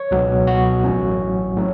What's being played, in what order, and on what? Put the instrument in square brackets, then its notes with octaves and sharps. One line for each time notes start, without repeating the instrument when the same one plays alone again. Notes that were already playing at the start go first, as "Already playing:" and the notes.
Already playing: [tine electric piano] C#5
C#2 B2 F#3 B3
F#4
A1 A2 F#3 C#4
A2 F#3